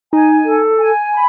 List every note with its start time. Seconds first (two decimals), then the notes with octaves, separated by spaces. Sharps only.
0.13 D#4 G#5
0.45 A4
0.80 G#5
1.13 B5